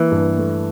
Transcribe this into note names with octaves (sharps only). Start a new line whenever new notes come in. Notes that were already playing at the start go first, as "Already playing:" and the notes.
Already playing: E3 A#3
G2
A3